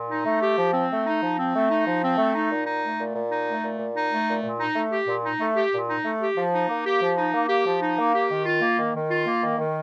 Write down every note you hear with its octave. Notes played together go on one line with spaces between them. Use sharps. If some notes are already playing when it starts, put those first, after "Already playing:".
Already playing: A#2
D#4
A3
G4
F3
C4
A3
D#4
F3
C4
A3
D#4
F3
C4
A3
D#4
A#2
D#4
A3
A#2
A#2
D#4
A3
A#2
A#2
D#4
A3
A#2
A#2
D#4
A3
G4
A#2
D#4
A3
G4
A#2
D#4
A3
G4
F3
D#4
A#3
G4
F3
D#4
A#3
G4
F3
D#4
A#3
G4
D#3
F4
A#3
D#3
D#3
F4
A#3
D#3
D#3